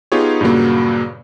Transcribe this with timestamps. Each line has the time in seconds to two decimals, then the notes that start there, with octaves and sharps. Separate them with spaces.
0.12 B3 D#4 F4 G4 G#4 C#5
0.41 G2 A#2 C#3 F#3 A#3